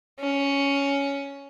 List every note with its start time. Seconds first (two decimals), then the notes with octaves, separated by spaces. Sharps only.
0.19 C#4